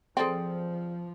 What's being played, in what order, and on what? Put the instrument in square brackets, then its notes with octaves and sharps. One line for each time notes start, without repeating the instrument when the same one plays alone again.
[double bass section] F3 [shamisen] C4 A4 [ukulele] G#4 D5 G5